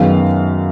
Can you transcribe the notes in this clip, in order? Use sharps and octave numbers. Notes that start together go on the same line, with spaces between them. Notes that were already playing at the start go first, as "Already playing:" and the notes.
Already playing: F#2 D#3 G#3 B3 F5